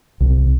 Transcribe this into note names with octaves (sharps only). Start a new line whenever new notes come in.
C2